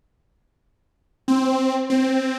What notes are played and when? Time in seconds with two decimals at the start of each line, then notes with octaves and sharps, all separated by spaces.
1.28 C4
1.90 C4